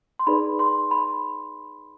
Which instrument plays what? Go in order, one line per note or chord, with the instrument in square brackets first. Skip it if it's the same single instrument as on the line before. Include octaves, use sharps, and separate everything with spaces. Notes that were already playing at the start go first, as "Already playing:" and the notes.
[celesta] C6
D#4 G#4 B4 D5 B5
C6
B5